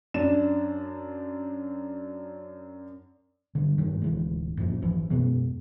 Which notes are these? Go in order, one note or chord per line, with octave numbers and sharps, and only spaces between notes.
F#2 D4 E7
D3 G3
G2 D#3
D1 E3 G#3
F#2 A#2 E3 F3
G#1 E3 F3
F#2 B2 G#3 B3